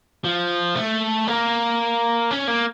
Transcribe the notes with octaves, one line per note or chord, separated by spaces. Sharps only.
F3
A3
A#3
C#4
A#3